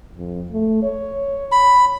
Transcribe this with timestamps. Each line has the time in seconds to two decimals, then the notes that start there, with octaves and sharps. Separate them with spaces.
0.16 F2
0.52 A3
0.83 C#5
1.52 B5